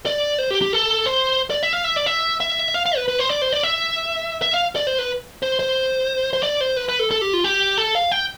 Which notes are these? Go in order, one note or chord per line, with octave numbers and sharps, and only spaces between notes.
D5
C5
G4
G4
A4
C5
D5
E5
F5
E5
D5
E5
E5
F5
F5
B4
B4
C5
D5
C5
D5
E5
E5
F5
D5
C5
B4
C5
C5
C5
D5
C5
B4
B4
A4
A4
G4
F4
G4
A4
F5
G5